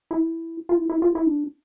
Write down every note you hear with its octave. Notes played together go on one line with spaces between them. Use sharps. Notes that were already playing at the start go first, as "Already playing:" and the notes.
E4
F4
E4
E4
F4
E4
D4